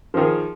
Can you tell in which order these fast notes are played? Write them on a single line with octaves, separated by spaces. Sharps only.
F3 D#3 G#4